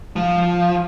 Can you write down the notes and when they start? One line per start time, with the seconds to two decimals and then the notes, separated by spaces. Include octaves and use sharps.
0.16 F3